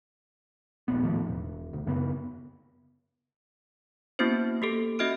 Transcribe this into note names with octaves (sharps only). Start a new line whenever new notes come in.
D#1 A#1 B3
A2 D#3 F3
E1
D2
F#2 C#3 B3
A#3 B3 C#4 E4 F#4 C5
A#3 G4 A4
C#4 F#4 D#5 E5 F6 D7